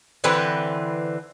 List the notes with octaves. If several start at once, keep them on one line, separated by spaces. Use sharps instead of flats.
D3 E3 C4 B4